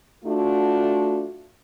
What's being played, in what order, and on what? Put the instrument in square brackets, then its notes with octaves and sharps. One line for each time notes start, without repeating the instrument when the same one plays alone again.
[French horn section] A3 D4 F4 F#4